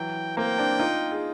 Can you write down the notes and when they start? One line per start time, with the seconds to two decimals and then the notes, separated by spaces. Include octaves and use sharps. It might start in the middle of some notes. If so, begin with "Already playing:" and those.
Already playing: E3 F#3 G5
0.37 A#3 C4 G5
0.58 C4 D4
0.79 D#4 F4
1.12 G#4